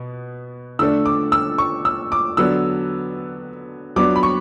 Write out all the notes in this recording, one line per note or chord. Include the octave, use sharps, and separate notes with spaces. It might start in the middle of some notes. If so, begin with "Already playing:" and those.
Already playing: B2 B3
D3 A3 D4 E6
D6
E6
C#6
E6
D6
D3 F#3 B3 D4 E6
F#3 B3 D4 D6
B5
C#6